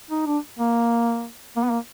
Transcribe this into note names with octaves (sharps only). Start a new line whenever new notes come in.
D#4
D4
A#3
A#3
B3
A#3